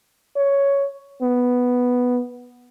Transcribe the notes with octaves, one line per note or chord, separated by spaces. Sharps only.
C#5
B3